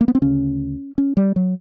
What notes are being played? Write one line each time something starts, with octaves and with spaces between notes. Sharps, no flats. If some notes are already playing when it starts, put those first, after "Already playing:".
A#3
B3
C4
D2 C#3 C#4
C#4
G3
F#3